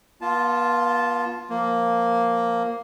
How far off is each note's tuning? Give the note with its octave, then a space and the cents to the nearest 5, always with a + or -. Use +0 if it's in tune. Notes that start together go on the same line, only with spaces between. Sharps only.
B3 -45 F4 +0 A5 -10
F3 +0 A#3 +0